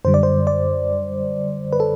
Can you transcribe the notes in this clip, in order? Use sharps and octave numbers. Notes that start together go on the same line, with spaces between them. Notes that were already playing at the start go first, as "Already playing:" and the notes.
F#2 D3 G3 C5
D5
C5
D5
B4
A4